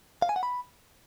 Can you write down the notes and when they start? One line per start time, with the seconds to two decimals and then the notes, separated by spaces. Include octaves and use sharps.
0.22 F5
0.29 G#5
0.36 F#5
0.43 B5